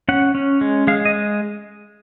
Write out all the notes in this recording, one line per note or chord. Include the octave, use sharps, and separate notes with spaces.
C#4 F#5
C#4
G#3
G#3 F5
D#5